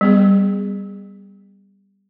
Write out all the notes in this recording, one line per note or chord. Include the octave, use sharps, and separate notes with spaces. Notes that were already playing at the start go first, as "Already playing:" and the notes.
G3 B3 G#4